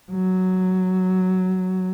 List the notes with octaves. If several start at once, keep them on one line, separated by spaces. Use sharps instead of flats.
F#3